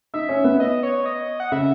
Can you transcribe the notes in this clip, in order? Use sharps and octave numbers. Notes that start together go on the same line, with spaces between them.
D#4 E5
C#4
B3
D#5
C#5
D#5
F#5
C#3 E5